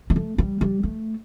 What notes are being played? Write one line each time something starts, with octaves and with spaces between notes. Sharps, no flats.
G3
A3
G3
G3
A3